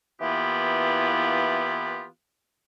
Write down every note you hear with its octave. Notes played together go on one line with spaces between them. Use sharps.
E3 A#3 B3 E4 F4 G4